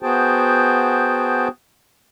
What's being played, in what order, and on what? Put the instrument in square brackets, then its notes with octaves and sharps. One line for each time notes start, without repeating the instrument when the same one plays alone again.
[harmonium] B3 F#4 G#4 C5 G5 A5